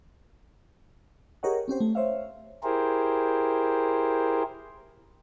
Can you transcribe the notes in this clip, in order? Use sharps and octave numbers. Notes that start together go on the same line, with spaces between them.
G4 G#4 A#4 C#5 D#5 F#5
C4 C#4 G4 C5
A3
C5 C#5 E5 F5
E4 G4 G#4 A#4 C5